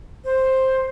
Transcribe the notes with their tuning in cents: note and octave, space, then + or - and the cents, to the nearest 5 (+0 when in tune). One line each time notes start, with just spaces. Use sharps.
C5 +5